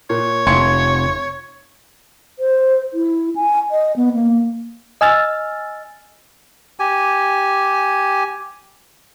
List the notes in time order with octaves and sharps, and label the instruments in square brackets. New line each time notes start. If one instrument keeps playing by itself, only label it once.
[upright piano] A#2 [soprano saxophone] C#5
[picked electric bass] F1 [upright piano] C6 G#6 C#7
[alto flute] C5
E4
G#5
D#5
B3
A#3
[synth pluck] D#5 G#5 E6 F6 A6
[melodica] G4 G#5